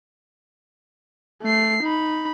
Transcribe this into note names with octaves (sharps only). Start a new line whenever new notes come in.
A3 C7
D#4 B5